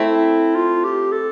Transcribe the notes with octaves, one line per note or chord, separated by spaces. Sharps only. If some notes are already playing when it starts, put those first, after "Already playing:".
Already playing: A3 C4 E4
F4
G4
A4